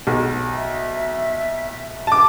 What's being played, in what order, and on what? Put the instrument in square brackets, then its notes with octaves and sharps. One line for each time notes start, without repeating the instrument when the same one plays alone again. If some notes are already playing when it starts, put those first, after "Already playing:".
[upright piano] B1
[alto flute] E5
[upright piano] A5 D6